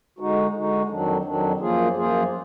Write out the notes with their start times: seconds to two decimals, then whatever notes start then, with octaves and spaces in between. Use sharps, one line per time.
0.19 D3 G#3 D#4 F#4
0.54 D3 G#3 D#4 F#4
0.89 F2 D#3 F#3 D4
1.24 F2 D#3 F#3 D4
1.60 F#2 F3 A#3 F4 G#4
1.96 F#2 F3 A#3 F4 G#4